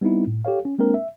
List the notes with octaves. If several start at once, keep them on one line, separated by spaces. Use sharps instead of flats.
G3 B3 C4 D#4 E4
A2
G4 A4 C#5 F5
C#4
G#3 A#3 C4 D4 A#4
E5